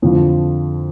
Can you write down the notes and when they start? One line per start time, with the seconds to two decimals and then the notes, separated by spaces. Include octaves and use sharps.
0.02 F2 D3 F3